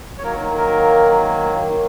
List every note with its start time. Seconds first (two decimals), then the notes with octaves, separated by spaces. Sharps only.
0.18 C#5
0.23 D#3 F#3 A#3 A#4
0.57 A#4
1.60 D#3 F#3 A#3